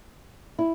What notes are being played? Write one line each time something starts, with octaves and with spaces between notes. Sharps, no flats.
E4